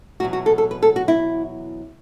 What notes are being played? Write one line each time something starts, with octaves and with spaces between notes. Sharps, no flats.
E2 B2 F#3 F#4
F#4
A4
A4
B4
A4
F#4
E4